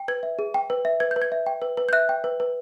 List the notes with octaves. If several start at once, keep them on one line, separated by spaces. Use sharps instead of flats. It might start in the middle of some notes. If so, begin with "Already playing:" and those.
Already playing: G5
B4 G#6
E5
G#4
G5
B4
E5
B4 G#6
G6
B4
G#6
E5
G5
B4
B4
G6
E5 F#6
G5
B4
B4